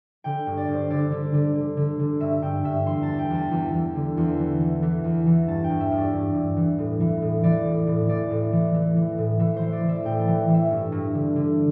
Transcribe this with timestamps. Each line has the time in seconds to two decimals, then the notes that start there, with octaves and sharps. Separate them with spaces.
0.24 D3 G5
0.46 G2
0.57 D5
0.69 G2
0.74 C5
0.90 D3 D5
1.12 D3
1.33 D3
1.55 D3
1.77 D3
1.99 D3
2.20 G2 E5
2.42 G2 G5
2.64 G2 E5
2.86 E2 C6
3.03 A5
3.08 E2
3.19 G5
3.30 E2 A5
3.51 E2
3.73 E2
3.95 D3
4.17 E2 C6
4.39 E3
4.60 E3
4.83 E3
5.04 E2
5.26 E3
5.47 G2 A5
5.64 G5
5.70 G2
5.80 E5
5.92 G2
5.97 D5
6.13 G2
6.34 G2
6.57 E3
6.78 A2
7.00 E3
7.22 A2
7.43 E3 D5
7.65 A2
7.87 A2
8.09 E3 D5
8.30 A2
8.53 E3
8.74 E3
8.96 E3
9.18 A2
9.39 E3 E5
9.56 C5
9.62 E3
9.73 D5
9.83 E3
9.89 E5
10.05 A2 G5
10.21 A5
10.27 E3
10.49 E3
10.54 E5
10.71 G2
10.92 G2
11.14 D3
11.36 D3